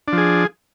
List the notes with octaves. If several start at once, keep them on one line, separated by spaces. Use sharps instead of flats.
F3 D4 G#4